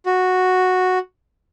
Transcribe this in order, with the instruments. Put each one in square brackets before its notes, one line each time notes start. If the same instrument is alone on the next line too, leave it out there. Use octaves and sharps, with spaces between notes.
[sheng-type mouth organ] F#4